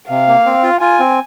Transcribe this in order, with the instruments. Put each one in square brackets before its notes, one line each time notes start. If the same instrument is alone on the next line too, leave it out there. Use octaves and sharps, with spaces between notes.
[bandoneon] C3 [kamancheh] F5
[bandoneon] A#3
C4
F4
[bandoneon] F4 [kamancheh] G#5
[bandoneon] C4